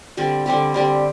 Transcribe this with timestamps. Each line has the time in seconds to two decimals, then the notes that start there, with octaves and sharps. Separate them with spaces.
0.17 D3 G3 C4 G4
0.46 D3 G3 C4 G4
0.74 D3 G3 C4 G4